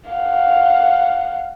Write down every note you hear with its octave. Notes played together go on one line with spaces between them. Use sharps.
F5 F#5